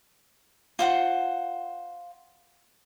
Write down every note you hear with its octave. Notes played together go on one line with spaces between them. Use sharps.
F4 C5 F#5